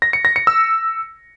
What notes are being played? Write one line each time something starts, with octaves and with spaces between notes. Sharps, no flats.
A#6
C#7
A#6
C#7
E6